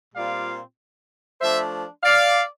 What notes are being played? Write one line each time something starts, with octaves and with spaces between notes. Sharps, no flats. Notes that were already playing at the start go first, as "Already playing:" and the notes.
A#2 G3 C4 F4 D5 F5
F3 A3 D4 C5 E5
D5 F5